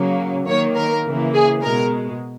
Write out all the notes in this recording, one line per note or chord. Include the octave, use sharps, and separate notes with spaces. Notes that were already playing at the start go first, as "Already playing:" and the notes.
Already playing: C#3 F#3 A#3
D#3 A#3 C#5
A#4
C#3 E3 A#3
G#4
B2 G#3 A#4